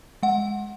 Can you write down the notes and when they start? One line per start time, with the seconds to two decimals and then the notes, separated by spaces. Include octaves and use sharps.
0.23 G#3 F#5